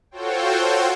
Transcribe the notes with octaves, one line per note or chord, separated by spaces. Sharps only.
F4 F#4 A4 C5 C#5 G5